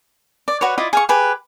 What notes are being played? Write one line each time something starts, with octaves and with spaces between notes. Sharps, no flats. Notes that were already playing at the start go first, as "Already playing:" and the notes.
D5
F#4 B4 C#5
E4 F4 D5 D#5
G#4 F5 C#6
G4 G#4 B4